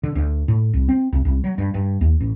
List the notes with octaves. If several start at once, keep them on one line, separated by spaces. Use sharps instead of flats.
D3
D2
A2
C2
C4
C2
C2
F#3
G2
G2
D#2
A1